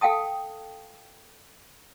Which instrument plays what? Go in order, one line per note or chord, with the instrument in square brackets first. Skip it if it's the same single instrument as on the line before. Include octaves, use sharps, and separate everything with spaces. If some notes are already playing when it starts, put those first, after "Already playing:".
[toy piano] A4 F5 G5 A5 D#6